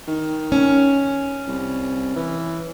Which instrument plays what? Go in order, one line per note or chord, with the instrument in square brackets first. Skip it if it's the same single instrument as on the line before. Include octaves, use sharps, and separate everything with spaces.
[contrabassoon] D#3
[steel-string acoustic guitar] C#4
[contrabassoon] C2
E3